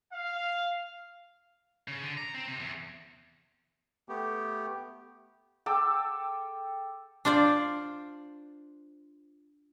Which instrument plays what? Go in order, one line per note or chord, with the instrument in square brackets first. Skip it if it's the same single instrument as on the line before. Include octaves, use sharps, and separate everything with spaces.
[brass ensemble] F5
[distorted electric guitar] C#3
D3
A#5
C4
C3
E2
[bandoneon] A3 B3 G4
[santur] A4 G5 D6 E6
[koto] D4 F4 C5 D5